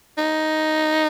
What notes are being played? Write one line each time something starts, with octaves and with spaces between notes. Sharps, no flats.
D#4